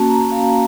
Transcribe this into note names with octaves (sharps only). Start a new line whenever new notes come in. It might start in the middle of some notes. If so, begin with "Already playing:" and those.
Already playing: A#3 C#4 F#4 A5
A#5
F5